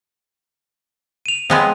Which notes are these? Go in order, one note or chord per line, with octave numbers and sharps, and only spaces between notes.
D#7 F7
F3 G#3 B3 C4